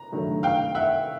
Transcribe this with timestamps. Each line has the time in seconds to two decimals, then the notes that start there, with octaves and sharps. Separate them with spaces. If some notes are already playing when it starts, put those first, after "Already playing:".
Already playing: A#5
0.12 G2 D#3 F#3 A3
0.43 F5 G5
0.75 E5 F#5